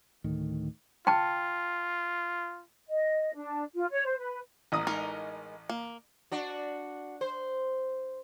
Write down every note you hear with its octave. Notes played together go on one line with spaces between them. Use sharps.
D2 A2 D#3
F4 G5 A5
D#5
D4
F4
C#5
C5
B4
A1 A#5 D#6
G#3 D#4 A#4
A#3
D4 F#4
C5